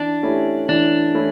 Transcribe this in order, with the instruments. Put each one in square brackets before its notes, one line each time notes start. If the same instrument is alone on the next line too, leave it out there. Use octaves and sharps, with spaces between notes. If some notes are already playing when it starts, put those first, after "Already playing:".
Already playing: [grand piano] E3 [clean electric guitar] D4
[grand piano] A3 C#4 E4 G4
[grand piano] E3 [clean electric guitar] D4
[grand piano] A3 C#4 E4